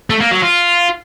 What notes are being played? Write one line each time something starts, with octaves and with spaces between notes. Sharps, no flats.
A3
A#3
F#3
F4